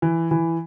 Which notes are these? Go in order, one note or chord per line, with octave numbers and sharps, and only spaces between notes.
E3
E3